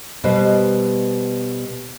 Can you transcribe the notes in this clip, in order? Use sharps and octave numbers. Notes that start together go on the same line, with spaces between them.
B2 G3 B4 C5 D#5